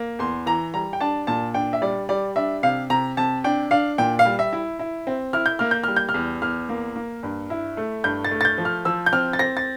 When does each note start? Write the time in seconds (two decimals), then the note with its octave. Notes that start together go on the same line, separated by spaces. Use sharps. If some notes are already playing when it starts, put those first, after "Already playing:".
Already playing: A#3
0.19 E2 C6
0.46 E3 A#5
0.74 G3 A#5
0.93 G5
1.01 D4 A5
1.27 A#2 A5
1.54 D4 G5
1.73 E5
1.82 G3 D5
2.09 G3 D5
2.36 D4 E5
2.63 C3 F5
2.90 C3 A#5
3.17 C3 A5
3.44 D4 G5
3.71 D4 F5
3.98 A#2 G5
4.19 F5
4.25 G3
4.39 E5
4.53 E4
4.79 E4
5.07 C4
5.33 E4 F6
5.46 G6
5.59 A#3 F6
5.71 G6
5.84 G3 F6
5.96 G6
6.09 F6
6.14 E2
6.42 E2 F6
6.69 A#3
6.96 A#3
7.23 G2
7.50 E4
7.77 A3
8.04 G2 G6
8.25 A6
8.31 A3
8.41 A6
8.45 G6
8.58 F3
8.65 F6
8.85 F3 E6
9.06 G6
9.12 C4 F6
9.33 A6
9.39 C4 A#6
9.57 A6